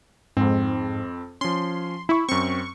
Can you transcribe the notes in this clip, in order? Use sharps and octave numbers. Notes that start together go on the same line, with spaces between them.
F2 G#2 C4
F3 C#4 C6
E4 B5 C#6
F#2 C4 C#6